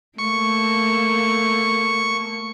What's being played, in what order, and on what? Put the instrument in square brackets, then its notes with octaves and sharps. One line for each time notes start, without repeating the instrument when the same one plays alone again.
[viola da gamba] A3 A#3 [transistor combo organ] C#6